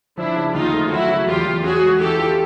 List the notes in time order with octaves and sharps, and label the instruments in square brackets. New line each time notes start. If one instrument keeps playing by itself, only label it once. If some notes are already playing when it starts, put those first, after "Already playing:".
[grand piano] F3 [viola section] D4 E4
[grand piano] C#3
[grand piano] D#2 [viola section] D#4 F4
[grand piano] A3
[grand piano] F#3 [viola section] E4 F#4
[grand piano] C#3
[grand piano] E2 [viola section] F4 G4
[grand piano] E2
[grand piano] C#4 [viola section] F#4 G#4
[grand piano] G#3
[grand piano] E3 [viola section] G4 A4
[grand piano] F4